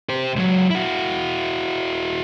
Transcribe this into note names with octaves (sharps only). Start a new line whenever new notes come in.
G4 C5
C#2 F#3
E4 F#4